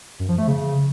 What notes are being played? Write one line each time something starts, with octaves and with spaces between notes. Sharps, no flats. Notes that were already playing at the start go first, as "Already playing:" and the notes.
F#2
F3
A3
C#3